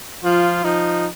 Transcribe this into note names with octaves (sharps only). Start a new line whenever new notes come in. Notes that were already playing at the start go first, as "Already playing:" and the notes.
F3 F4
F3 D#4